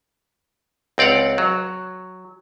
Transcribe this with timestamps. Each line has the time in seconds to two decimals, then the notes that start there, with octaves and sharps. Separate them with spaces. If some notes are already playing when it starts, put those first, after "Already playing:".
0.98 C#2 C4 D5 F5 F#5
1.38 F#3